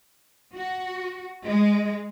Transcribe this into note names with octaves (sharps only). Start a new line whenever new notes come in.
F#4
G#3